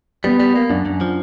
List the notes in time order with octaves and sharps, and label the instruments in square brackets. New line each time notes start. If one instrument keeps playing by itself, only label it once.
[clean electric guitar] G3 [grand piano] B3
[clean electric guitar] G3
A#3
[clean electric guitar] F#2 [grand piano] D4
[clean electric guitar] F#2
F3